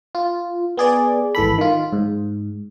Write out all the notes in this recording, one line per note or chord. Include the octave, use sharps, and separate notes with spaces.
F4
B3 G#4 D5
G#1 E3 A4 B5
D#3 F4
G#2